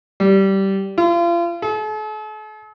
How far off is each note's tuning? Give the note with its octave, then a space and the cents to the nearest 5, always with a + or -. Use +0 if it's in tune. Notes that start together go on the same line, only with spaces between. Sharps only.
G3 -15
F4 -35
A4 -45